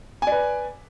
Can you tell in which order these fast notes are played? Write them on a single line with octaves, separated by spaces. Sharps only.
G#5 D5 B4